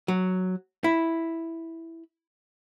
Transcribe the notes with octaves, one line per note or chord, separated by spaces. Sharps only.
F#3
E4